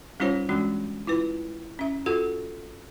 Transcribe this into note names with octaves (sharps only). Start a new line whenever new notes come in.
G3 C#4 D#4 F4 C5 C#5
E3 G#3 C#4 D4 F#4
E4 F4 B4
C#4 E5
F4 F#4 A4 F#5